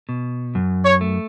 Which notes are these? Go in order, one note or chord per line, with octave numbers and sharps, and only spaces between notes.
B2
F#2
C#5
A3